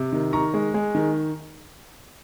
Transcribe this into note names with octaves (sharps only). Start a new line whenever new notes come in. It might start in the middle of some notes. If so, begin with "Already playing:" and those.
Already playing: C3
D#3
D#3 A#5 C#6
G#3
G#3
D#3